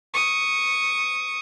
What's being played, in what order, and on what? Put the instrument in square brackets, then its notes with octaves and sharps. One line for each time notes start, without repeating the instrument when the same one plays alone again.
[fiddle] C#6 D#6